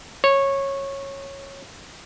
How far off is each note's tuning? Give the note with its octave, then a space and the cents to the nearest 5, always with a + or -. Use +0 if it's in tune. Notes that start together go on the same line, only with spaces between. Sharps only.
C#5 -15